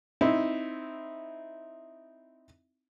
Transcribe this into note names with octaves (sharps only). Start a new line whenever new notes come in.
C4 D#4 E4